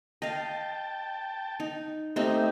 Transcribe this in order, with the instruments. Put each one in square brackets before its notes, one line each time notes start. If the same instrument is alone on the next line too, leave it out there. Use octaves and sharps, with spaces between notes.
[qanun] D#5 F5 [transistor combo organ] G5 A5
[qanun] D#4
[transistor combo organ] A3 D#5 E5 [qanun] C4 D#4 G4